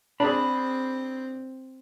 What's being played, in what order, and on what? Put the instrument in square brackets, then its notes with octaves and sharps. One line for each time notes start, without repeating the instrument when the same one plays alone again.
[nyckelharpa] C4 [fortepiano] D4 G#4 [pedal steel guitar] B5